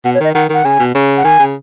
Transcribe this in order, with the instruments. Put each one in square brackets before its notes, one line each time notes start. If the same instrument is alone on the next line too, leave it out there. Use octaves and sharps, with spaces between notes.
[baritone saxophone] B2 [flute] F#5
[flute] C#5
[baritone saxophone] D#3 [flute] D#5
[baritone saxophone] D#3 [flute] F#5
[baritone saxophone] D#3 [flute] F#5
[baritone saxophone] C#3 [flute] G#5
[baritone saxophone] B2
C#3
[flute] F#5
[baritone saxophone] D#3 [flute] G#5
[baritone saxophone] C#3